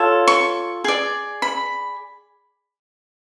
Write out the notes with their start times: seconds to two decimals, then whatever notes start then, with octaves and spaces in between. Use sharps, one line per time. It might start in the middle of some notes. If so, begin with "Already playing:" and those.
Already playing: F4 A4 C#5
0.28 C#6
0.84 G#4 D5
1.42 B5